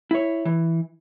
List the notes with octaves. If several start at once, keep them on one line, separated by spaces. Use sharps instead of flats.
E4 C#5
E3